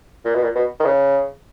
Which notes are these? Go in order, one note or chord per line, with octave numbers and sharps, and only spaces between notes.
A#2
B2
A#2
B2
D#3
C#3